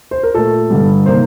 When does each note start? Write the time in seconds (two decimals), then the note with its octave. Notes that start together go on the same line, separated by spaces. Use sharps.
0.11 C5
0.23 A#4
0.35 A#2 A3 A4
0.70 G2 D3 G3
1.06 C3 D#3 A#3 C5